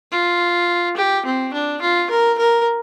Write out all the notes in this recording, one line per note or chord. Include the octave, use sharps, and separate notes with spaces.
F4
G4
C4
D4
F4
A#4
A#4